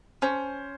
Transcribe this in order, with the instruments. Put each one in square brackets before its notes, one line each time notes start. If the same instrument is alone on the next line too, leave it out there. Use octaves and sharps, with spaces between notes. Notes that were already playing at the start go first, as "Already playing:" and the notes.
[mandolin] C#4 [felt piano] C5